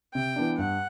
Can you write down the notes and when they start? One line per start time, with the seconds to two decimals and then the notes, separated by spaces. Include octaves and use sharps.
0.14 C3 G5
0.36 E3 B3 D4
0.57 G2 F#5